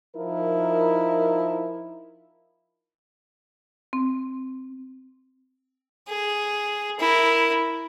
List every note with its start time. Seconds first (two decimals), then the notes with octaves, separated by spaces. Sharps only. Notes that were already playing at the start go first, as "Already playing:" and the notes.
0.16 F3 D#4 E4 A#4
3.93 C4
6.08 G#4
6.99 E4 A#4